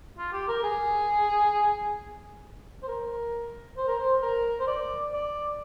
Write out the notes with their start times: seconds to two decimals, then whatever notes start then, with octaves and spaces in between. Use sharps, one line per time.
0.18 F4
0.33 G4
0.48 A#4
0.64 G#4
2.83 C5
2.88 A#4
3.78 C5
3.88 A#4
3.99 C5
4.23 A#4
4.60 C5
4.68 D5
5.13 D5